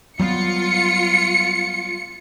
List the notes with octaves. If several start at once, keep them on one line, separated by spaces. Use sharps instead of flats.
F#3 G3 B3 F4 C#7